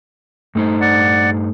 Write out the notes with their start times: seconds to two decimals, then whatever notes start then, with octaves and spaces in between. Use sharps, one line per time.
0.55 G2 A3 D#4 C5
0.81 D5 F#5